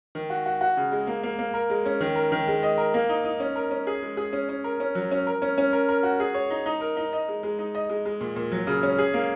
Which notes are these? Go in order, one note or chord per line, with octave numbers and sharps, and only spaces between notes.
D#3
F#4
F#4
F#4
C#3
G#3
A#3
A#3
A#3
A#4
G#3
C#4
D#3
A#4
D#3
G#3
D#5
A#4
A#3
D#4
D#4
C#4
A#4
C#4
G#4
G#3
G#4
C#4
C#4
A#4
C#4
F#3
C#4
A#4
C#4
C#4
A#4
A#4
F#4
G#4
C#5
D#4
D#4
A#4
D#4
D#5
G#3
G#3
D#4
D#5
G#3
G#3
A#2
A#2
F#3
C#3
C#4
G#4
A#3